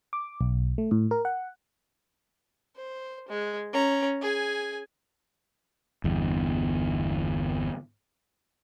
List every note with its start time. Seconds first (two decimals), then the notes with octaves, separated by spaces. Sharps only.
0.13 D6
0.41 B1
0.78 A3
0.91 A2
1.11 A#4
1.25 F#5
2.76 C5
3.28 G#3
3.73 C#4 A#5
4.21 G#4 G#5
6.04 G1 E2